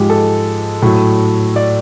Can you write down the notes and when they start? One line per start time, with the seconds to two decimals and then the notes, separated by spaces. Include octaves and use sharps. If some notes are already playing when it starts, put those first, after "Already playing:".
Already playing: G#2 F3 G#3 G4
0.10 A4
0.82 A2 F#3
1.56 D5